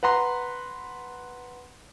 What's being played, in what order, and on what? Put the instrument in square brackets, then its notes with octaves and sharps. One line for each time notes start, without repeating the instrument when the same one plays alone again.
[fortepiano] B4 F#5 A#5 C6